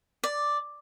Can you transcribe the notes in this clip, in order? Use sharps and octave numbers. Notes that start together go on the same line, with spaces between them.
D5